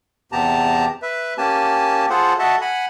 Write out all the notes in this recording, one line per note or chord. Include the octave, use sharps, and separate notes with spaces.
E2 C3 B3 G4 A5 A#5
B4 E5
A#3 C#4 G4 G#5 A5
F4 G#4 A4 C5 F#5
F#4 A4 D#5 E5 F#5 A5
F#5 G#5 B5